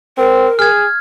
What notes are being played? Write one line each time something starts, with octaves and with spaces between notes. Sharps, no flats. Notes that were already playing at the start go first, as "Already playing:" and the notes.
C4 A#4
G#4 F6 G#6